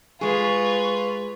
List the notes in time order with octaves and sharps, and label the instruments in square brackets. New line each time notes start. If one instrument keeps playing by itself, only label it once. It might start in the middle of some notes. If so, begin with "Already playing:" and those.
[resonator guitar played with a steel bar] G#3 G#4 [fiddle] F4 B4 [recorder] C#6